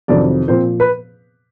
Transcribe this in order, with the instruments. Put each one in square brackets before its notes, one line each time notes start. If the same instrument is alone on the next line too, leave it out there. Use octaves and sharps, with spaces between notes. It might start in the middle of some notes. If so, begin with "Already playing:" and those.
[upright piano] F2 C3 D#3 F#3 D4 D5
A#2 F3 C4 C5
B4